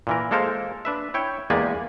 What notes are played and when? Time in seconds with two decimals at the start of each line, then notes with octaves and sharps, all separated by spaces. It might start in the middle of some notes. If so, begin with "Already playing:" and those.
0.07 A#2 E3 A#4
0.31 G#3 A#3 A4 A#4 C5 F5
0.85 D4 B4 E5
1.14 E4 C#5 G5
1.50 E2 G#3 A#3 G4 D5 G#5